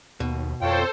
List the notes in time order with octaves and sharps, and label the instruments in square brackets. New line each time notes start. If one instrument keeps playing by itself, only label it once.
[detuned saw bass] D#2 [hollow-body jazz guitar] B2
[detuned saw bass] F2 [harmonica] F4 C#5 G5 [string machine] A4 C5